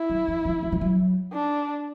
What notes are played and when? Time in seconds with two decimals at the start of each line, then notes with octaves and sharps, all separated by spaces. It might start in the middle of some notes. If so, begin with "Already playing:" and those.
Already playing: E4
0.10 F#3
0.28 F3
0.45 F3
0.63 F#3
0.72 F3
0.81 F#3
1.34 D4